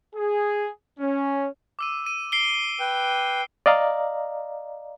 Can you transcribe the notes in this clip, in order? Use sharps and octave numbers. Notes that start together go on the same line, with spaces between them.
G#4
C#4
D6 E6 D#7
D#7
C7 D7 G7
B4 G5
D5 D#5 F5 A#5